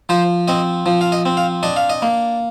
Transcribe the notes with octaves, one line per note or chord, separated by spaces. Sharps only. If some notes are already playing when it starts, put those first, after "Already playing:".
F3 C5
C4 D#5
F3
F5
D#5
C4
F5
D4 D#5
F5
D#5
A#3